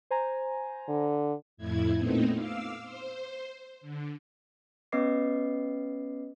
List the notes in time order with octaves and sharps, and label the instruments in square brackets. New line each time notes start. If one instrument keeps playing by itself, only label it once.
[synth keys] C5 G#5 A#5
[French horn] D3
[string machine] F2 A2 E4 G#6
A#2 A3 B3 C4 D#4
F5 D6 E6
C5
D3
[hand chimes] B3 C#4 B4 D#5 D6 C7